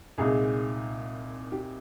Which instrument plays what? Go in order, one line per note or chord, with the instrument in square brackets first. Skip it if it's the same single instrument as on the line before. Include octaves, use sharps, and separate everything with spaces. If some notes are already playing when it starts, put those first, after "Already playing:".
[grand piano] C2 A#2 G#3 D#4 [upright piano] G#4
[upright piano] G4